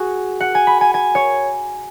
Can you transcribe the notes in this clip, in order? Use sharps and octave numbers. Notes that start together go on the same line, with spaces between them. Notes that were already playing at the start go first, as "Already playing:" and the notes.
Already playing: F#4 G#4
F#5
G#5
B5
G#5
G#5
C#5